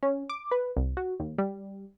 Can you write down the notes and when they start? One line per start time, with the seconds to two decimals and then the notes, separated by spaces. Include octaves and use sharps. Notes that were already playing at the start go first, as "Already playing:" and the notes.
0.03 C#4
0.29 D6
0.51 B4
0.77 C2
0.97 F#4
1.20 D#2
1.38 G3